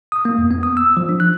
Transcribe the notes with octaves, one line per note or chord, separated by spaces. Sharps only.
D#6
A#3
F2
B3
D#6
E6
F3
D4
F#6